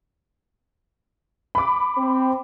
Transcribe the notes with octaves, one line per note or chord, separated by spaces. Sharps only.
B5 D6
C4